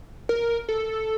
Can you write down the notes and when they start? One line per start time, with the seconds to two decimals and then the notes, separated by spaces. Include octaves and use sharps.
0.29 A#4
0.69 A4